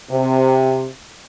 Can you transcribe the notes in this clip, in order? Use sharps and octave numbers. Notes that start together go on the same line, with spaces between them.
C3